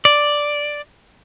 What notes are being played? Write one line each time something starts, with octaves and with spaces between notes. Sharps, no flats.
D5